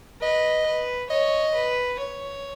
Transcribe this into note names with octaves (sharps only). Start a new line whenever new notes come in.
B4 D#5
B4
C#5 D#5
B4
C#5